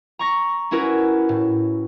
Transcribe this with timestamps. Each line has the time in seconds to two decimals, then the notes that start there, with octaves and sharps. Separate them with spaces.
0.19 A#5 C#6 A#6
0.71 C#4 E4 F#4 A#4 B4
1.29 A2